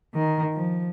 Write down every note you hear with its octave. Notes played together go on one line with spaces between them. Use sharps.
D#3
F3